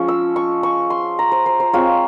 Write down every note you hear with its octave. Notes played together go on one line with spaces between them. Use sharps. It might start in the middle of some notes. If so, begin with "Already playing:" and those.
Already playing: F3 G#3 C#4 C#6
E6
C#6
C#6
C6
A#5
C5
C5
C5
G#3 C4 F4 C#5